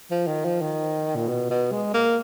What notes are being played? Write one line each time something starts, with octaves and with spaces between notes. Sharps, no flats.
F3
D#3
F3
D#3
A#2
B2
B2
G#3
A#3